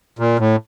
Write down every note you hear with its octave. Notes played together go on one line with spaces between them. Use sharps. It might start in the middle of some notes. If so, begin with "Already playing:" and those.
A#2
A2